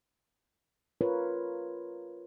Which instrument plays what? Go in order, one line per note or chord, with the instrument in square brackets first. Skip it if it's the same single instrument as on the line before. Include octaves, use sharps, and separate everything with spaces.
[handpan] F4 A#4 B4 C#5